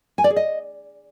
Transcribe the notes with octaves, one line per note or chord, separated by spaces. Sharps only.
G#5
D5
G#4
D#5